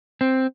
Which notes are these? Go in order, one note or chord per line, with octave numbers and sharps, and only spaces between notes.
C4